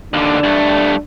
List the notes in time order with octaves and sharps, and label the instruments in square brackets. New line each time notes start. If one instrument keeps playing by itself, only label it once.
[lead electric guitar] D#2 D3 [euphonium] D4
[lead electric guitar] G2 A3